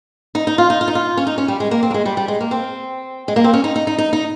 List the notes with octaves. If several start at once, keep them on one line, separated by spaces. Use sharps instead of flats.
D#4
D#4
F4
D#4
F4
D#4
F4
C#4
D#4
C#4
G3
G#3
A#3
C4
A#3
G#3
G3
G3
G#3
A#3
C4
G#3
A#3
C4
C#4
D#4
D#4
D#4
D#4
D#4